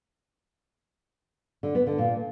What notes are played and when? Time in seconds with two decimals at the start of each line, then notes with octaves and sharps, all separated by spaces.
1.63 D3
1.75 B3
1.87 D3
1.98 A#2